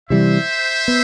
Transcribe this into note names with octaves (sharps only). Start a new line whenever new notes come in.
C3 E3 G3 C5 E5
B3